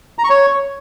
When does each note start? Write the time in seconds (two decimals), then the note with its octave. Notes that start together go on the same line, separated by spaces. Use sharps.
0.19 A#5
0.24 C#6
0.30 C#5